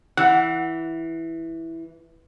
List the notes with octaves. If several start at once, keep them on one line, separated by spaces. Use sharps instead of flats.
E3 F#5